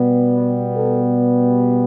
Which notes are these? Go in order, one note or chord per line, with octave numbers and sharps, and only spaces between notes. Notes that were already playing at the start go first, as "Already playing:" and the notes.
Already playing: B2 G3 B3
A4